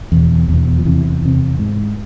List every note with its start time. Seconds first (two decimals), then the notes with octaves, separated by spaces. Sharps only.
0.12 E2 B2
0.49 E2 B2
0.78 F3
0.85 E2 C3 E3
1.22 E2 C3
1.59 G#2